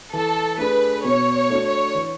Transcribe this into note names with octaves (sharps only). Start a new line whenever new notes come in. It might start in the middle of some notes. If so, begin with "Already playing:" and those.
E3 A4
A3 D4 G#4 B4
B2 C#5
C#5
A3 D4 F#4
C#5
E3